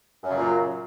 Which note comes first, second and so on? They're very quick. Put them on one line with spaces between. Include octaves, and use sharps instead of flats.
F#2 C#3 F#3 A#2